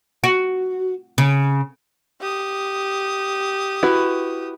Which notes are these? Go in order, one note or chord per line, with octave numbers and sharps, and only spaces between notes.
F#4
C#3
G4 D#6
E4 F#4 B4